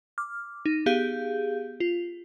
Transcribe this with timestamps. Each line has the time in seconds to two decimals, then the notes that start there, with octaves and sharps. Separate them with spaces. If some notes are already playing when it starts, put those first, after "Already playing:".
0.18 D6 F6
0.66 D#4
0.86 B3 G4 G#4 F5 G6
1.80 F4